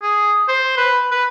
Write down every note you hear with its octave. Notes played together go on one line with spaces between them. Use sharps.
G#4
C5
B4
B4